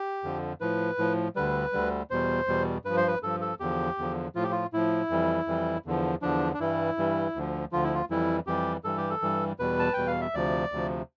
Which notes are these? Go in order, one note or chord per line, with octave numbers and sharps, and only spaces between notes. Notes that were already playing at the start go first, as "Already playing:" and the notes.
Already playing: G4
F2 D3 F3
A2 F3 B4
A2 F3
D2 D3 G3 B4
D2 D3 G3
E2 B2 G3 C5
E2 B2 G3
G2 F3 B4
C5
B4
G2 F3 A4
A4
E2 D3 F3 G4
E2 D3 F3
A2 F3 F4
G4
F4
A2 F3 E4
F2 E3 G3
F2 E3 G3
E2 D3 F3
E2 D3 F3 D4
D4
G2 E3 G3 E4
G2 E3 G3
D2 D3 F3
D2 D3 F3 F4
E4
F4
F2 E3 G3 E4
F2 E3 G3 G4
G2 E3 G3 A4
G4
A4
G2 E3 G3
E2 B2 G3 B4
A5
E2 B2 G3 G5
F5
E5
D2 C3 F3 D5
D2 C3 F3